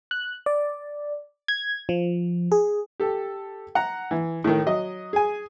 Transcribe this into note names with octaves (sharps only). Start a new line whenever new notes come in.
F#6
D5
G#6
F3
G#4
G4 A4
F#5 A#5
E3
A2 D#3
F#3 D#5
G#4 G#5